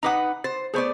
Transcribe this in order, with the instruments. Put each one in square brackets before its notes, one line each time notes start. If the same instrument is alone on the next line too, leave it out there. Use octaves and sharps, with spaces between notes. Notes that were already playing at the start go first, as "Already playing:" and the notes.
[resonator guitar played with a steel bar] D#4 B4 F#5 [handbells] A#5 D6 D#6
[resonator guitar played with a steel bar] C5 [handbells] A6
[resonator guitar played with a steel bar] A3 B3 D5 [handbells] G#4 C5 C#6